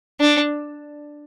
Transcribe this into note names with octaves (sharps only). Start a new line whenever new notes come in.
D4